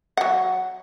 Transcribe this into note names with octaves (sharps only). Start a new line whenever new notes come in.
F#3 F#5